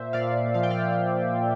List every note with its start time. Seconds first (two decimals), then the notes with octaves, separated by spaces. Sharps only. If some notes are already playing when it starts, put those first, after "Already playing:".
Already playing: A#2 C5 E5
0.13 A#2 D5 F5
0.54 F3 F5
0.63 G5
0.70 D5 F5